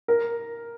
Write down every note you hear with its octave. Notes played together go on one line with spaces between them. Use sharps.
A#4